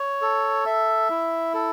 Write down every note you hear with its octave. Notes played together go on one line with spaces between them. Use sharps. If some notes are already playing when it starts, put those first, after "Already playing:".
Already playing: C#5
A4
E5
E4
A4